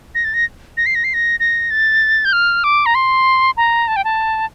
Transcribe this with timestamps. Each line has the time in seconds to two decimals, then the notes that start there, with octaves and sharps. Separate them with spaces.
0.15 A#6
0.25 A6
0.34 A#6
0.77 A#6
0.86 C7
0.95 A#6
1.04 C7
1.14 A#6
1.40 A#6
1.71 A6
2.25 G6
2.33 F6
2.64 D6
2.86 A#5
2.95 C6
3.57 A#5
3.88 A5
3.96 G5
4.04 A5